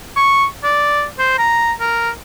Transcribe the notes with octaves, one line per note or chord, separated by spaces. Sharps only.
C#6
D5
C5
A#5
A#4